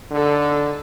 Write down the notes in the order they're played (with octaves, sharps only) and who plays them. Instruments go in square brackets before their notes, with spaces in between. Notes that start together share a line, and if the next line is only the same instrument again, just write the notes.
[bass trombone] D3 [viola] D#4 A4